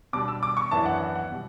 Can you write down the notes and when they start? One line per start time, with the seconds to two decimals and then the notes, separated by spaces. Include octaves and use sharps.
0.13 B2 G3 D4 D6
0.28 E6
0.43 D6
0.57 C#6
0.71 F#2 E3 B3 D4 A5
0.86 F#5
1.00 F#5
1.15 F#5
1.31 B2 G3